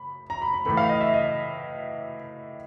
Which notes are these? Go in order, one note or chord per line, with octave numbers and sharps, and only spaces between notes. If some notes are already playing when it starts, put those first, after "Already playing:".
Already playing: B5
A#5
B5
B5
A2 E3 A3 B5
F5
D#5
E5
D#5